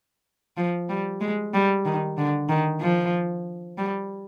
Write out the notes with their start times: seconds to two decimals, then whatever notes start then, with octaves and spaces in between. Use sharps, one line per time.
0.57 F3
0.89 G3
1.21 G#3
1.54 G3
1.85 D#3
2.18 D3
2.49 D#3
2.81 F3
3.78 G3